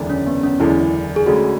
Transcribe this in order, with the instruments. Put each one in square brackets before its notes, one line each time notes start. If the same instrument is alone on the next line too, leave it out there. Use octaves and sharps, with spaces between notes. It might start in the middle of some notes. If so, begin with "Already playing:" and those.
Already playing: [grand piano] F#1 E2 D3 G#3 D4
[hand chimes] C#4
B3
C#4
[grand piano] F#1 E2 D3 G#3 D4 [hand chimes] E4
[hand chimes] G#4
[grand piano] D2 D3 G#3 C#4 [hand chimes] F#4